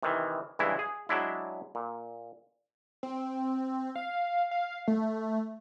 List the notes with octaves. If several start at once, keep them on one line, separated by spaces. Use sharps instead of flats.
C3 D#3 E3
G2 C#3 E3 G#3 E4
G#4
F#3 G#3 D4 E4
A#2
C4
F5
F5
A3